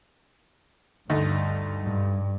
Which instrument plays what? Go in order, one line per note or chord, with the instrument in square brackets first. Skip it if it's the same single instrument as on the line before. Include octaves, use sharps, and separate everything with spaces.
[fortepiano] D2 A3 D#4 [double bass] G2
[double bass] G2